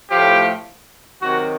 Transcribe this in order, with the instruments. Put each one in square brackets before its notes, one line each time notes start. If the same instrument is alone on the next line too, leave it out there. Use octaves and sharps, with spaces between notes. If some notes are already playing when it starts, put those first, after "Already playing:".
[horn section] A2 F3 G4
C3 D#3 F#3 F#4